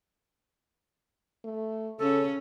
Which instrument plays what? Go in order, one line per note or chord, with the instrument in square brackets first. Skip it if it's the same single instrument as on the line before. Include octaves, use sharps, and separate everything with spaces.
[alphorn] A3
[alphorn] C#3 [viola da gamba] C#4 [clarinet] A4